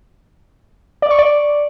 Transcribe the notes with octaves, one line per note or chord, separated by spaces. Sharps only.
D5
C#6
D5